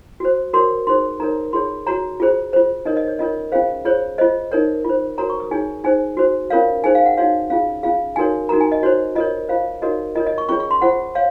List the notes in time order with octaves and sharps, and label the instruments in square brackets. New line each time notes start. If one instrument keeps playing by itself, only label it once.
[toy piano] F#4 C5
F#4 A#4 C#5 C6
D#4 G#4 C5 C6
D#4 A#4 C#5 A#5
F4 G#4 C#5 C6
F#4 C#5 A#5
F4 G#4 C5
F4 C5
D#4 A#4 C#5 D#5
D#5
C#5
C#4 F4 A#4 C#5 D#5
C#4 F4 G#4 C5 F5
F4 G#4 C5 C#5
F4 C5 D#5
D#4 A#4 C#5
F4 C5
F#4 A#4 C#5 A#5
C#6
D#6
D#4 G#4 C#5 G#5
D#4 G#4 C5 G#5
F#4 C5
C#4 F4 A#4 C#5 F5
D#4 G#4 C5 G#5
F5
F#5
D#4 F#4 C#5 F5
C#4 F4 G#4 F5
C#4 F4 G#4 F5
D#4 F#4 A#4 C#5 G#5
D#4 F#4 A#4 A#5
G#5
D#5
F#4 C5 C#5
F4 A#4 C#5 D#5
F4 C5 F5
D#4 F#4 A#4 C#5 D#5
F4 A#4 C#5 D#5
D#5
C#6
C#4 F4 G#4 C#5 C#6
C#6
C6
F4 C5 F#5
C#5 F5